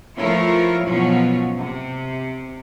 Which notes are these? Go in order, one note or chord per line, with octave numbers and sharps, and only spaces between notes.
F3 A3 E4 F4 A#4 C#5
G#2 B2 F3 F#3 C#4 F#4
C3